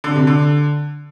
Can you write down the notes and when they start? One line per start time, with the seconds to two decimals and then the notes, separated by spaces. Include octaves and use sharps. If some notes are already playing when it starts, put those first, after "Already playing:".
0.04 D3
0.16 C3
0.27 D3